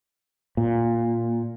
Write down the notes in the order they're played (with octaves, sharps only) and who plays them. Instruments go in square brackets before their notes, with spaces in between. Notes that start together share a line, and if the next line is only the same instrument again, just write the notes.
[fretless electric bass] A#2